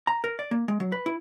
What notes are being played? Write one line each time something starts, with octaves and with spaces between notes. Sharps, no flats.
A#5
A#4
D5
A#3
G#3
F#3
B4
E4